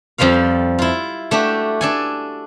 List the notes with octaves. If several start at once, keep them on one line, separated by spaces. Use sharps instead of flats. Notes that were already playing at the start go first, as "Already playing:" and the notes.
F2 F3 G3 F4 F5
E4 F4
A3 D4 F#4 G4
D4 A4 G#5